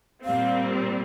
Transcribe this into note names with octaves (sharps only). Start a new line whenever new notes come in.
A#2 G3 C4 F5